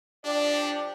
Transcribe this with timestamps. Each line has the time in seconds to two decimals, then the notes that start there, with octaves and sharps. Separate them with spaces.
0.25 F3 D4 G4 D5